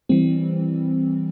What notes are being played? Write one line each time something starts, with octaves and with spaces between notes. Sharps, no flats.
E3 G3 C4